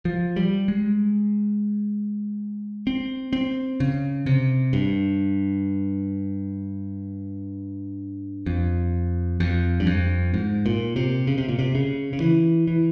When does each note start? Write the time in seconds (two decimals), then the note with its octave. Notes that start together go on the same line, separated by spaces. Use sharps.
0.05 F3
0.36 G3
0.68 G#3
2.87 C4
3.33 C4
3.80 C#3
4.26 C3
4.73 G2
8.46 F2
9.40 F2
9.80 G2
9.87 F2
10.34 G#2
10.66 A#2
10.96 C3
11.27 C#3
11.38 C3
11.49 A#2
11.59 C3
11.75 C#3
12.13 C#3
12.20 E3
12.68 E3